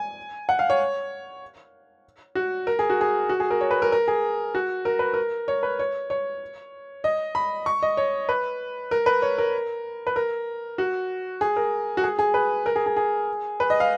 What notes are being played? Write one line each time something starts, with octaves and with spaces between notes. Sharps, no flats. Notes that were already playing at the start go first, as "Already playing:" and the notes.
Already playing: G#5
F#5
F5
C#5
F#4
A#4
G#4
F#4
G#4
F#4
G#4
A#4
C#5
B4
A#4
A#4
G#4
F#4
A#4
B4
A#4
C#5
B4
C#5
C#5
D#5
B5
C#6
D#5
C#5
B4
A#4
B4
C#5
A#4
B4
A#4
F#4
G#4
A#4
F#4
G#4
G#4
B4
A#4
G#4
G#4
G#4
B4
D#5
F5